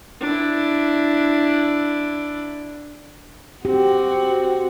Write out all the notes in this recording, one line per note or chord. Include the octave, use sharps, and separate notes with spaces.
D4 E4
C4 F#4 G4